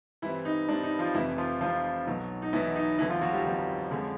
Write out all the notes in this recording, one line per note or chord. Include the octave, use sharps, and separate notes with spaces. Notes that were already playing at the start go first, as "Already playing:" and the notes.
G2 E3 G3 C4 E4
D#4
G2 E3 G3 C4 D4
D#4
F3 F4
F1 F2 C3 E3 E4
F3 F4
F1 F2 C3 E3 F3 F4
B1 B2 F#3
D#4
B1 B2 E3 F#3 E4
D#4
G1 F2 D3 E3 F#3 E4
F3 F4
F#3 F#4
G3 G4
G1 F2 D3 F#3
F2 D3 F3 G#3 C#4